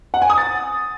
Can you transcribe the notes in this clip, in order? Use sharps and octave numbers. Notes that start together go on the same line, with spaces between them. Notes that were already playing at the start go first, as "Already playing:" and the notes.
F#5
G#5
D#6
A6